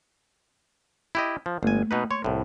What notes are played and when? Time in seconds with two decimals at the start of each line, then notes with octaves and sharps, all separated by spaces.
1.15 E4 G4 D#5
1.46 F3
1.63 G1 A3 A#3 G#5
1.91 B2 D#4 B4
2.11 C#5 C6 C#6
2.24 C2 A2